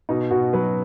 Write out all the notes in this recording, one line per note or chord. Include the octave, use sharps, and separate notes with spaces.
B2 D#4
B2 F#4
F#3 B4